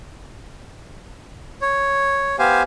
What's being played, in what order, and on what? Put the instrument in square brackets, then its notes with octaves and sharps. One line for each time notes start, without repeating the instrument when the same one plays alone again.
[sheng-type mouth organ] C#5
B3 G4 C5 F5 G#5